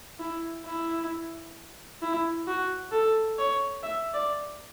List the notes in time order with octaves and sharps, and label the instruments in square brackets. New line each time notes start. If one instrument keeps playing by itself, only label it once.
[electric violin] E4
E4
E4
F#4
A4
C#5
E5
D5